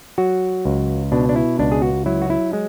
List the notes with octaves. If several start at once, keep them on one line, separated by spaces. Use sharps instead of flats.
F#3 F#4
C#2
B2 D4
D4
E4
C#2 D4
G#4
F#4
F#3 E4
F#4
E4
G#3